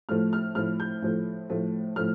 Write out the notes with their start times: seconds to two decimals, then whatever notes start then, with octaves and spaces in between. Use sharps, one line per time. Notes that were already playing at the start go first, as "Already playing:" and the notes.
0.09 A2 F3 A3 F6
0.33 F6
0.55 A2 F3 A3 F6
0.80 G6
1.02 A2 F3 A3
1.50 A2 F3 A3
1.96 A2 F3 A3 F6